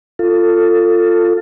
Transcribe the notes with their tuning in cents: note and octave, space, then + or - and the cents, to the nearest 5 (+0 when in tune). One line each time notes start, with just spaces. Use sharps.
F4 +0 A4 +20